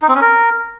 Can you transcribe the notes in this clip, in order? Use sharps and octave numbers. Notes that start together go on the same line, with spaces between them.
D#4
C4
C#4
A#4